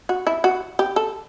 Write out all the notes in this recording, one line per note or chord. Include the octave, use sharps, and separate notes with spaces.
F#4
E4
F#4
G4
A4